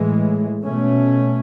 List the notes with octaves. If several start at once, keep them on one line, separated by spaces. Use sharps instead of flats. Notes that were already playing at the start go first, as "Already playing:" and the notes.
Already playing: A2 E3 G#3
B2 A3 C#4